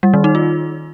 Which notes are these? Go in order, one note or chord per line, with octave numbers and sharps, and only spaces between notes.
G3
D#3
D#4
F4